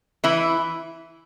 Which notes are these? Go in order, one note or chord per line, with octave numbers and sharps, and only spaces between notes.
E3 E4